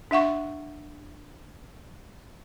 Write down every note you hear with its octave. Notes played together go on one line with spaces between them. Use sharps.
D4 E5 F#5 C#6